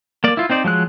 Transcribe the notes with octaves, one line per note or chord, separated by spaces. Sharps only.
A#3 D5
E4 F4
C4 D#4 C5 D5
F3 F#3 G#3 F#6